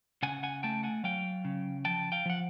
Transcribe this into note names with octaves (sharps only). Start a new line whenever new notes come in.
C#3 F#5 G#5
F#5 G#5
A3 G5 A5
F#5 G#5
F#3 F5 G5
C#3
F3 G5 A5
F5 G5
F3 F#5